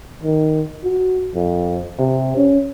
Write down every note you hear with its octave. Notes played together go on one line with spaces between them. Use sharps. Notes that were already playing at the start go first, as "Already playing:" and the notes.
D#3
F#4
F2
C3
C#4